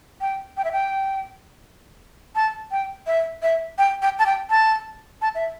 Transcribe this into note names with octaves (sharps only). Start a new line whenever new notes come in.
G5
G5
E5
G5
A5
G5
E5
E5
G5
G5
A5
G5
A5
A5
E5